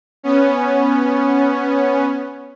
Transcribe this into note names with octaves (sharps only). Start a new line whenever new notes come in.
B3 C#4